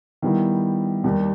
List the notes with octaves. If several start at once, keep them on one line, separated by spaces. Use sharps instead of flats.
D#3 G3 B3 E4
D#2 D#3 G3 A#3 D#4